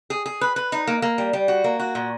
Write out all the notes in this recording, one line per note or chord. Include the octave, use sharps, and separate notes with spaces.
G#4
G#4
B4
B4
D#4
A#3
A#3
G3
G3
F#4
A#3
F#4
A#2